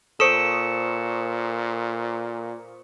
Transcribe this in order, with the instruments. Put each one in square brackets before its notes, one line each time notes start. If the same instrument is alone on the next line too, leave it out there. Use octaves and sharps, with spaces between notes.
[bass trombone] A#2 [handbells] A4 [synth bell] C5 C#6 D#6 [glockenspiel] C#7 E7